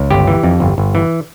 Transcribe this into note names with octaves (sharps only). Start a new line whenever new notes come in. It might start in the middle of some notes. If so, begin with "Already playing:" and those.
Already playing: C#2
G1 G4
E3
F2
G1
G1
E3